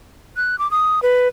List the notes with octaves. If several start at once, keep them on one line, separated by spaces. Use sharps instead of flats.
F#6
D6
D#6
B4